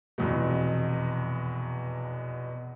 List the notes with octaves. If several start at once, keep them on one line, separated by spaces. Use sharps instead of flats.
F1 E2 B2